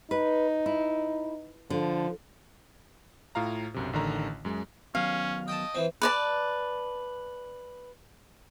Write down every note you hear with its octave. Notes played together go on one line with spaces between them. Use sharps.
D#4 B4
E4
D3 F3
A2 F4 F5 A#5
B1 F#2 C3
A1 D3 D#3 A#5
F#2 G#3
D#3 F#3 B3 C#4 F5
D#5 G5 A5
E3 C4
B4 D5 A5